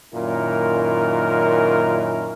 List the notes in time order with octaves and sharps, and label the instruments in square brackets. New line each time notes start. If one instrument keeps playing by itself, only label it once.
[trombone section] F#2 A#2 D#3 E4 A#4